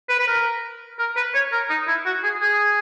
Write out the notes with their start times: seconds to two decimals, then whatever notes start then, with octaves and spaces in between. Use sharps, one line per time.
0.10 B4
0.20 B4
0.27 A#4
0.99 A#4
1.17 B4
1.35 C#5
1.52 A#4
1.70 D#4
1.88 E4
2.05 F#4
2.23 G#4
2.42 G#4